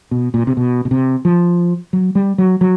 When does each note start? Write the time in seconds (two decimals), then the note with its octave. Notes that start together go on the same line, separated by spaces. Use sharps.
0.11 B2
0.34 A#2
0.47 C3
0.57 B2
0.85 B2
0.91 C3
1.25 F3
1.93 F#3
2.15 G3
2.38 F#3
2.61 F#3